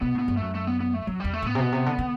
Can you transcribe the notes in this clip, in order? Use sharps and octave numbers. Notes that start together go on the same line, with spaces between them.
B2 B3
A2 B3
G2
F#2 A3
A3
B3
B3
A3
E2 F#3
E2 G3
A3
A2 B3
C3
B2
C3
D3
D3